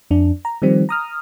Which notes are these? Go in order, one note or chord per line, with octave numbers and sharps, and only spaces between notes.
F2 D4
A#5
D#3 F3 G3 C4
A#5 D#6 F6